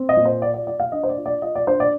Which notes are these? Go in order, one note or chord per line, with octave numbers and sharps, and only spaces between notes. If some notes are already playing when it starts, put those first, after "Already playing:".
Already playing: C4
D#5
A#2
C5
F4 D5
D5
F4 D5
F5
D4 D#5
C5
D5
F4
D5
F4 D#5
D5
D4 C5
D5